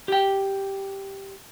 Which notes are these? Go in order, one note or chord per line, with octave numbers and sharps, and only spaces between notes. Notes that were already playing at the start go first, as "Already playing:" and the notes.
G4 G5